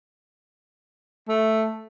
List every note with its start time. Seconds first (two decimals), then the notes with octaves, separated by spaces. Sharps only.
1.28 A3